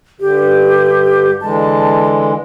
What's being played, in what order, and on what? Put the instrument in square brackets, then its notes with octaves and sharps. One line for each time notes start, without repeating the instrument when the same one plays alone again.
[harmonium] G2 D3 [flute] G4
[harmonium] D3 E3 G#3 [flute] A5